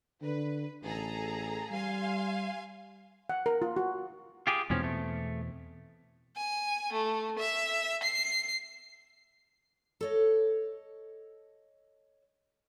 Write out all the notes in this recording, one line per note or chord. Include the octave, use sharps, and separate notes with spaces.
D3 B4
A1 G#4 A4 A#5
G3 F5 G#5 C6
F#5
A#4
F4
F#4
F4 G4 G#4
E2 G#2 B2 F3 C4 C#4
A3
G#5
A3
E5
C7
A4 C#5 D#5